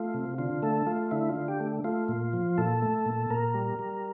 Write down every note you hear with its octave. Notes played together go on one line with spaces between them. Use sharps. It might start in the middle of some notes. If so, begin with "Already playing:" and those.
Already playing: A3 F4
C3
D3 F4
A3 A4
A3 F4
D3 E4
F4
D3
G4
A3
A3 F4
A#2
F3
A#2 A4
A3
A#2
A#2 A#4
G3
G3